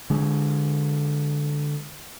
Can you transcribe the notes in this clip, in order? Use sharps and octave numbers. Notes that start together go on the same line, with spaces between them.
D3 G#3